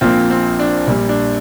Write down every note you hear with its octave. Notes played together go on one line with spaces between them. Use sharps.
A#1 A#2 F3 A#3 C4 F4
C4
D4
A#1 A#2 G3
D4